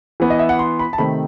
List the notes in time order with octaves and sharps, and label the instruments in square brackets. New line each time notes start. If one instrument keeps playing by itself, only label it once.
[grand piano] E3 B3
D#5
E5
F#5
C6
B5
A5
C3 D#3 A3 C4 B5